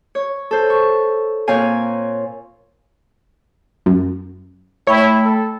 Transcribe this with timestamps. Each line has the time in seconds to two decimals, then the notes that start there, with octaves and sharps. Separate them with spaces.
0.15 C#5
0.51 A4 C5
0.70 C#6
1.48 A#2 C4 C#5 F5 G#5
3.86 F#2
4.87 A3 E4 C#5 G5 B5
5.25 A4